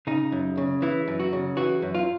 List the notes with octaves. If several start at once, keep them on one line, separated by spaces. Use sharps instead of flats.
C#3 D#4
F#2
C#3
E3 E4
F#2
F#4
C#3
E3 F#4
F#2
F4